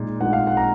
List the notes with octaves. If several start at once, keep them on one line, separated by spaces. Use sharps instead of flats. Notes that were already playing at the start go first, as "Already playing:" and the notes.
Already playing: A#2 G#3 D#4
A#2 G#3 D#4 F#5
F5
F#5
A#5